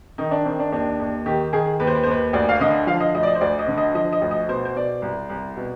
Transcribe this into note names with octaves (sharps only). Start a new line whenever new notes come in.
D#3 D#4
D4
D#3 C4
D4
D#2 D4
D#2
D#3 G4
D#3 G#4
D#2 B4
C5
B4
C5
D#2 B4
D2 D5
F5
D3 D#5
F3 F5
D#5
D2 D#5
D5
D#5
C5
D2 D5
D#5
D3
D#5
F3 D#5
D#5
D2
D#5
B2 C5
C5
B2 D5
C2
C2
B2